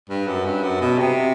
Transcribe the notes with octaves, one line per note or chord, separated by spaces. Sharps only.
G2
F#2
G2
F#2
B2
C3